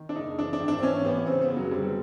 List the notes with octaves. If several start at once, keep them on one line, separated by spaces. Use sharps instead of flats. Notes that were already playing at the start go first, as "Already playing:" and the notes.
Already playing: D#3
D4
F#1 D#4
E3 D4
D4
G#1
D4
C4
E3 C#4
A1 B3
C#3 C4
B3
F#1
F#3
D3 G3